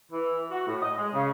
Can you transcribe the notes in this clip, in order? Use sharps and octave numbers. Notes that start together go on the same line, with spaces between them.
E3
F#4
A2
D#5
G#3
C#3